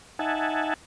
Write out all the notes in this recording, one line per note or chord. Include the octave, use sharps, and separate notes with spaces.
D#4 E5 F#5 G#5 A5